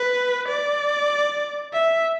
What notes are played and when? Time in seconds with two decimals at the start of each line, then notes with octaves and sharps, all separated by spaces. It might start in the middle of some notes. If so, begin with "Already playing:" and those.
Already playing: B4
0.48 D5
1.73 E5